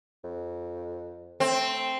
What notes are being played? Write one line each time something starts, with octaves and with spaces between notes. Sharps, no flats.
F2
A3 C4